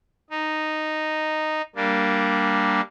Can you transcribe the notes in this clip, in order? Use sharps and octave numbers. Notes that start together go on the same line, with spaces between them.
D#4
G3 A#3 D4